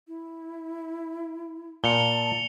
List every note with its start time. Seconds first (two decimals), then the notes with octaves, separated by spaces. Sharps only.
0.08 E4
1.84 A#2 A5 C#7 F7 G7